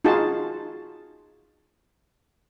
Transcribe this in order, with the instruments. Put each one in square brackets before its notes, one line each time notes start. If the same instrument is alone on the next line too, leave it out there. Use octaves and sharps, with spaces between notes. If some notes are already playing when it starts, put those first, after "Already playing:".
[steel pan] D#4 F4 F#4 G#4 A5